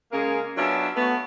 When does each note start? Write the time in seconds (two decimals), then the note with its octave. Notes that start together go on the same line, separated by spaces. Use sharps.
0.12 C#3 G#3 A#3 C#4 G#4 A#4
0.56 F#3 B3 C#4 D4 F4 E5
0.95 A3 B3 F#4